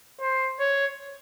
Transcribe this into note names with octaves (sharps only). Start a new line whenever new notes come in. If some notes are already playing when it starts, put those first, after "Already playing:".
C5
C#5